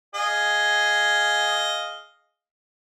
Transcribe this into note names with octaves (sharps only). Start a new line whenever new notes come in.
G#4 D#5 F5